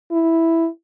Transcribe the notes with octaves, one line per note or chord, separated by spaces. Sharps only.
E4